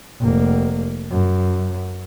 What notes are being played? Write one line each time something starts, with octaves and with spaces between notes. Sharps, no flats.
F1 A#3
F#2